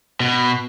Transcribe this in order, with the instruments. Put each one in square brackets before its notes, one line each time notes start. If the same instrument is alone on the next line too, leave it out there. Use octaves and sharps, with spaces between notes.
[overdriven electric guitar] B2